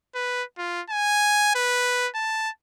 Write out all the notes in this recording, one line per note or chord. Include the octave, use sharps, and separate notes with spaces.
B4
F4
G#5
B4
A5